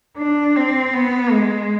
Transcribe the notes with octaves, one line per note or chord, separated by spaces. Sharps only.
D4
C4
B3
G#3